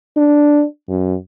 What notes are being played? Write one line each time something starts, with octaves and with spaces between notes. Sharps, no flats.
D4
F#2